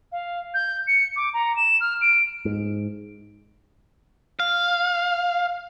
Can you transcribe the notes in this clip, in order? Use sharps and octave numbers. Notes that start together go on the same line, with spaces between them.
F5
G6
C#7
D6
A#5
E7
F6
D7
G#2
F5